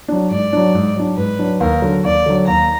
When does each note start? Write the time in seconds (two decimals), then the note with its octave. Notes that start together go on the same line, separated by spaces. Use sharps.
0.08 F#3 D4
0.30 G#2 D5
0.53 F#3 D4
0.75 G#2
0.96 F#3 D4
1.17 G#2 B4
1.39 F#3 D4
1.60 D#2 A#4
1.82 D3 F#3
2.04 D#2 D5
2.26 D3 F#3
2.47 D#2 A#5